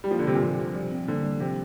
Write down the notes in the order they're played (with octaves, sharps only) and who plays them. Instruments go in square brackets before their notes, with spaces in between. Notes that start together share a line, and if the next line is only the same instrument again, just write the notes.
[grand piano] G3
[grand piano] F3 [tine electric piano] A#3
[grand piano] D3
[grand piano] C3 [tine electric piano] G3
[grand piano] A#2
[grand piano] C3 [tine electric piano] F3
[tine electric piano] F3
G3
C4
[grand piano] D3 [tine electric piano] A#3
[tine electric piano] G3
[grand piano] C3 [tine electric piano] F3